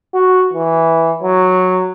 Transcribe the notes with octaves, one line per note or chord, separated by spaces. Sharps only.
F#4
E3
F#3